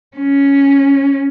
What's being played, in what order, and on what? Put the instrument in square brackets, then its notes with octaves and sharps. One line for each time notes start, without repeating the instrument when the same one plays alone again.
[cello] C#4